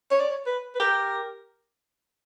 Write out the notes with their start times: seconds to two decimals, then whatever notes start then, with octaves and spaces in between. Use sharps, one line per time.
0.11 C#5
0.20 D5
0.29 C#5
0.46 B4
0.75 B4
0.80 G4 A#4